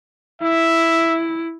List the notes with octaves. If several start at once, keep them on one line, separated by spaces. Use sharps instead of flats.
E4 E5